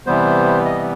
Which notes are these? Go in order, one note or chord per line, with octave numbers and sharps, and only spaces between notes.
C3 E3 G3 B3 C5
D#5